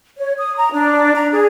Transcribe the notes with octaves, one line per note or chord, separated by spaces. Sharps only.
C#5
D#6
A#5
D4
A#5
G#4